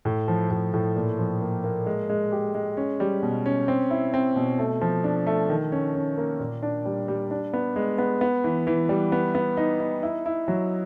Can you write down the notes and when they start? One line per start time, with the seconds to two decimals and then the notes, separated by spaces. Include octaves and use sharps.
0.05 A2
0.28 F3
0.50 A2
0.74 A2
0.96 A#2
1.19 F3
1.41 A#3
1.64 A#3
1.86 G#3
2.09 G#3
2.32 G4
2.55 G#3
2.77 C#4
3.00 G3
3.22 B2
3.46 C#4
3.68 C4
3.91 E4
4.14 C4
4.36 B2
4.59 A3
4.81 F3
5.04 D4
5.27 A3
5.49 D#3
5.72 C#4
5.95 C#4
6.18 A#3
6.40 A#2
6.62 D4
6.85 G3
7.08 G3
7.31 D4
7.53 B3
7.76 G#3
7.98 B3
8.21 B3
8.44 E3
8.67 E3
8.89 G3
9.12 B3
9.35 B3
9.57 D#4
9.80 D#4
10.03 E4
10.26 E4
10.48 F#3